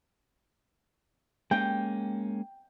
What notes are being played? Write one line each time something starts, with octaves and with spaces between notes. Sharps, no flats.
G#3 A#3 C#4 G5